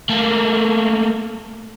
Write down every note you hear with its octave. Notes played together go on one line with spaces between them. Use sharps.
A3 A#3